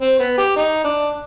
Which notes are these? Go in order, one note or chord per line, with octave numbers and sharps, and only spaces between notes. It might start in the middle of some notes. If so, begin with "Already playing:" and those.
C4
B3
G4
D#4
D4